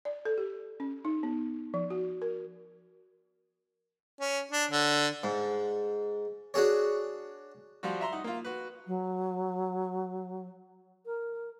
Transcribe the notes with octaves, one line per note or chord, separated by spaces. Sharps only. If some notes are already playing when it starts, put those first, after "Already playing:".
D5
A4
G4
C#4
D#4
B3
F3
F#4
A#4
C#4
D4
D3
G#2
D4 F#4 G#4 C#5
F3 G3 F4 F#4
E5 A#5 C6
D#4 F#5
A#3 F4
F#4 B4
F#3
A#4